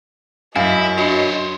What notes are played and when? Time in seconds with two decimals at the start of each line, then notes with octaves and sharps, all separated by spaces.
0.56 F#2 E4 D#5 F5
0.98 D4 F#4 C5 C#5